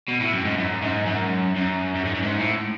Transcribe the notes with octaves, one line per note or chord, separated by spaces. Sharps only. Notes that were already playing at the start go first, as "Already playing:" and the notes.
B2
A2
F#2
G#2
F#2
G#2
F#2
F#2
F#2
G#2
F#2
G#2
A2